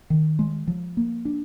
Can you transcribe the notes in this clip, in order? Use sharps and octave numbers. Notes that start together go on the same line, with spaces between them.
D#3
G#3
F3
A#3
D4